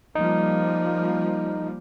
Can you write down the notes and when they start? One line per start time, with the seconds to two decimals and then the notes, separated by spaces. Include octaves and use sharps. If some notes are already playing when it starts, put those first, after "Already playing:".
0.15 F3 G3 A#3 D#4